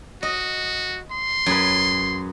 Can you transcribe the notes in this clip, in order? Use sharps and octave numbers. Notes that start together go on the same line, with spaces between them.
F#4 D#5
C6
F#2 G#4 B4